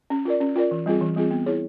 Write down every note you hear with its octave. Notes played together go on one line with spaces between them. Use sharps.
C#4
F4 A#4 D5
C#4
F4 A#4 D5
E3
G3 C4 F4 G#4
E3
G3 C4 F4 G#4
B3
E4 G#4 C#5